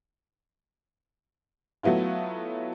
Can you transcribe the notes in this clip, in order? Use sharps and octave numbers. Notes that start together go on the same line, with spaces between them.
F#3 A3 B3 E4 F4